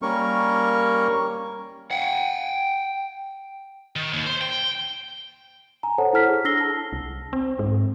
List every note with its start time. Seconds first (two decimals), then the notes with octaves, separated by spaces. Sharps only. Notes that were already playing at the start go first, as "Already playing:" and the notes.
0.02 G3 A#3 C#4 A#4 C#6
1.91 F#5 G5
3.96 D#3
4.13 D#2
4.26 C5
4.41 G5
5.83 G#5 A#5
5.98 A4 C5 C#5 F#5 A5 A#5
6.13 E4 A4 F6 B6
6.28 G#4
6.45 D4 E6 A#6 C7 G7
6.61 A5
6.93 C2
7.33 C4
7.59 G#2